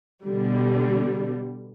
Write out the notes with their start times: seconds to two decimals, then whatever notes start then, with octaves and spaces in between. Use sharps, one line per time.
0.24 B2 D3 G3